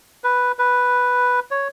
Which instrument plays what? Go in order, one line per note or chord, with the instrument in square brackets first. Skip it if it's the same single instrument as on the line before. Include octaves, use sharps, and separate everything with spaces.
[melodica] B4
B4
C#5